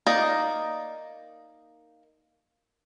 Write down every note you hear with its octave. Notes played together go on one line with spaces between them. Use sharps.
A#3 D#4 D5 D#5